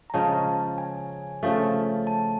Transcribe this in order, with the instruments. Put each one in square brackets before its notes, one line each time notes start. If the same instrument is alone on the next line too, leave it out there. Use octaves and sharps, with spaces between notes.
[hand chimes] A#5
[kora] C#3 F3 G#3 C#4 [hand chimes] A5
[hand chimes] G#5
[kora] C#3 F3 A3
[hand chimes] A5